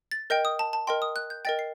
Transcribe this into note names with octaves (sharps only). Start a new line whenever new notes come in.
A6
A#4 D#5 G5 G6
D#6
A5
A5
A#4 D#5 G5 C6
D#6
F#6
G6
A#4 D#5 G5 A6
C7